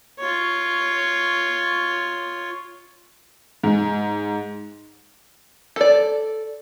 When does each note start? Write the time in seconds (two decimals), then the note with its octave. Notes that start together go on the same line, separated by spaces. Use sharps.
0.19 F4 C#5
3.64 G#2
5.76 A4 D5